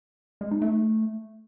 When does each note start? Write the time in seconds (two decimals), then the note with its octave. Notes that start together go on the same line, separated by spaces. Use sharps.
0.41 G#3
0.51 D#4
0.62 A3